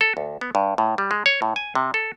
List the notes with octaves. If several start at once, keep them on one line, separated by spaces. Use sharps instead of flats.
A4
D2
B3
G2
A2
G3
G#3
C#5
A2
G#5
C3
A4